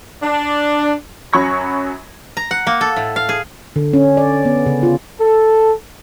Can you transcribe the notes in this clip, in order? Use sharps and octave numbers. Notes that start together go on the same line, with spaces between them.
D4
F#2 F#3 B5 C#6 G#6 A#6
A#5
F#5
A#3
A4
A2
F5
G#4
D3
C#4
D5
B3
C#3
F4
A4